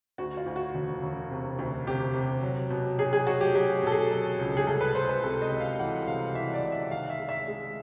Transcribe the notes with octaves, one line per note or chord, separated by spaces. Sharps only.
D2 F#4
F4
D2
F#4
E1
E1
C3
D2
C3 G4
C3
F#3
B2
F#3 G#4
G#4
F#3 F#4
G4
F#3 G4
B2 A4
G#4
F#3
C#2
G#4
C2 A4
B4
G#3 C5
B4
C3 A4
D#5
C3
F5
E3 F#5
C3 F5
E3 E5
D5
C2
E5
D#3 F5
E5
G#3
E5
G#3